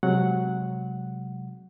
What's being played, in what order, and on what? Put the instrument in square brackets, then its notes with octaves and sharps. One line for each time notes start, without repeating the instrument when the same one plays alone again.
[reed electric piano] C3 F#3 G#3 F#5